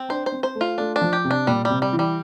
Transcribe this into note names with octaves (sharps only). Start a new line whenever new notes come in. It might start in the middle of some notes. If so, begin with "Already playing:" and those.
Already playing: C4
D4 C5
C5
C4
C5
A3
F4
A3 D4
D4
F3
G4
C3
D4
A#2 G3
C3 G3
G3
E3
G3